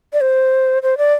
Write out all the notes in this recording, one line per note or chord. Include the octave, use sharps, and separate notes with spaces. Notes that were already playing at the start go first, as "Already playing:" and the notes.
D5
C5
C5
D5